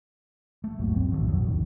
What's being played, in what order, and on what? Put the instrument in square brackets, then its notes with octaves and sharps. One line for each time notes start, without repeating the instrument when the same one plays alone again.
[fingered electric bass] A3
A#1 D#2 G#2 F#3
F1 A#1 F#2 C4
B1 A2 D#3 F#3
F2 A2 F#3
E1 C#2 D#3